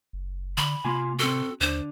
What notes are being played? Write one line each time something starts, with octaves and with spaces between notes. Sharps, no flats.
F#1
D3 B5
C3 A#3 F4 G#5
C4 F#4 A4
D#2 D3 D4 C5